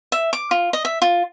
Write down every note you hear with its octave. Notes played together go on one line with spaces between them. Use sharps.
E5
D6
F4
D#5
E5
F4